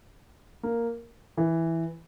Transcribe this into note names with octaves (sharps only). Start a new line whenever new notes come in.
A#3
E3